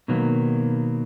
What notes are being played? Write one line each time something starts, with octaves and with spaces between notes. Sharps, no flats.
B2 D#3 F#3 A#3 B3